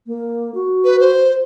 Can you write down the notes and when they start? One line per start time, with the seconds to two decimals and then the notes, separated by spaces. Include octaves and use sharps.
0.06 A#3
0.54 F#4
0.85 B4
1.00 C5